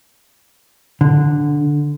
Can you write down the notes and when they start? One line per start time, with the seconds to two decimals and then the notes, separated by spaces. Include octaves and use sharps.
1.01 D3